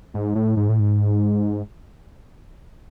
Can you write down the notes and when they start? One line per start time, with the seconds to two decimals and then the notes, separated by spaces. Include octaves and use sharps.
0.14 G#2
0.35 A2
0.57 G#2
0.69 A2
0.80 G#2